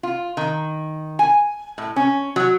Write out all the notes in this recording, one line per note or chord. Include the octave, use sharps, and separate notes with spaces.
F4
D#3
G#5
A2
C#4
F#3